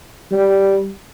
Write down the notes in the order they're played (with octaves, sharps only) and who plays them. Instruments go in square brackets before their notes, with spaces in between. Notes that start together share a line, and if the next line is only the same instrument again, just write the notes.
[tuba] G3